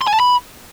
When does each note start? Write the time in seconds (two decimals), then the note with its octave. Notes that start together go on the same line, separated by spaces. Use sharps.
0.01 C6
0.08 G#5
0.14 A5
0.20 B5